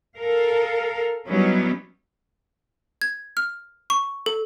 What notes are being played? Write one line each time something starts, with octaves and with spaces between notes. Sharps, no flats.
A4 A#4 F5
F#3 G3 B3 C#4 D#4 E4
G#6
F6
C#6
A4